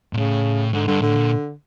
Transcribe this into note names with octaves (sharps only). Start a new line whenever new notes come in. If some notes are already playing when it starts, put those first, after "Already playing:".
A#2
A2 C#3
G#2 D3
G2 D3
A2 D3
A#2